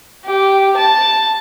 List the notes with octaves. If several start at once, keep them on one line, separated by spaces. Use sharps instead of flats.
G4
A5